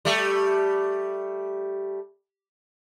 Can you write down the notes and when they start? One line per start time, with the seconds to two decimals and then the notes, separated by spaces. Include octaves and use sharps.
0.05 G3 A3